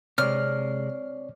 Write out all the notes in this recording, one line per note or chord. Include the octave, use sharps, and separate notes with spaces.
C3 G#3 C4 C#5 D5 F6